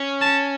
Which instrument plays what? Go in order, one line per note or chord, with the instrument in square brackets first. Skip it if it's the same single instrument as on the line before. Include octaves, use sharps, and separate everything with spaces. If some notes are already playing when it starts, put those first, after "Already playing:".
Already playing: [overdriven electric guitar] C#4
[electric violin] A5